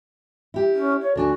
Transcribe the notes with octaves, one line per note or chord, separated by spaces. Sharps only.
E4 G4
C#4
C#5
D2 D4 F#4 G#5